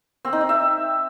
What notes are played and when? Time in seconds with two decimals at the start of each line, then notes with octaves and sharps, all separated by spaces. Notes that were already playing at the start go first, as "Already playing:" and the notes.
0.25 C4
0.33 D#4
0.41 D#5
0.49 E5